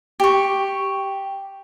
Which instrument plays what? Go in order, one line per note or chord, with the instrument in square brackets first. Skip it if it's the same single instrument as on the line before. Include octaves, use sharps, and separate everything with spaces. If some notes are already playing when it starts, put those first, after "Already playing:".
[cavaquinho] G4 C#6